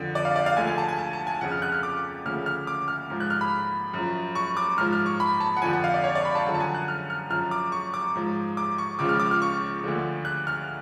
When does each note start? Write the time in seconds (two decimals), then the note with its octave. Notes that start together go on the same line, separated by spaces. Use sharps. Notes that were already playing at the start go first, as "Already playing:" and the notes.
Already playing: F2 D3 F3
0.15 D5
0.25 F5
0.36 D5
0.46 F5
0.56 D2 D3 F3 G#5
0.67 G#5
0.78 A5
0.89 G#5
0.99 A5
1.13 A5
1.27 G#5
1.41 F2 C#3 F3 F#5
1.52 F6
1.62 F#6
1.72 F6
1.83 D6
2.25 D2 C#3 F3 F6
2.46 F6
2.67 D6
2.88 F6
3.10 G#2 F3
3.20 F#6
3.30 F6
3.41 B5
3.94 F#2 F3
4.35 C#6
4.57 D6
4.78 G#2 F3 F6
4.93 F6
5.06 C#6
5.20 B5
5.40 A5
5.57 F#5
5.62 F2 D3 F3 G#5
5.73 F#5
5.84 F5
5.94 D5
6.04 C#5
6.15 D5
6.25 B5
6.35 A5
6.46 F#2 D3 F3 F#5
6.55 A5
6.60 G#5
6.75 F#6
6.88 F6
7.10 F6
7.30 F#2 F3 F6
7.51 D6
7.72 C#6
7.94 D6
8.15 G#2 F3
8.57 D6
8.78 C#6
8.99 C#2 C#3 F3 D6
9.09 F6
9.20 D6
9.31 F6
9.42 C#6
9.84 D2 D3 F3
10.25 F#6
10.47 F6